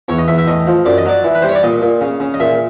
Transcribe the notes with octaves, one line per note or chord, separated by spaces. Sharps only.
E2 C#5
D#5
E2 E5
E5
A2 D#5
F3
F#2 D5
D#5
F#3 D5
E3
B4
G3 C5
C#5
D5
A#2 D#5
A#2
C#3
C#3
D#5
A#2 E5